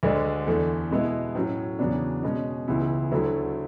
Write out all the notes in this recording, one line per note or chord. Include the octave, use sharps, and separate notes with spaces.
D2 D3 G#3 D4
E2 D3 A3
B2 G#3 B3 E4
A2 F#3 C#4
E2 C#3 F#3 B3 D4
B2 G#3 C#4
C#2 C#3 E3 B3 E4
D2 D3 F#3 A3 E4